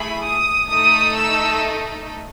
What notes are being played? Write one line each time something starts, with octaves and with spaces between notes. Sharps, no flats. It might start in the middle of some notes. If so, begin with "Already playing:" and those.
Already playing: A3 E4 G#4 B5
D#6
A3 D#4 A4 D#6
E6